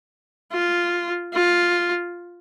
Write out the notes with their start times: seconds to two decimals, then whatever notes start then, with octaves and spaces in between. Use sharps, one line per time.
0.53 F4
1.34 F4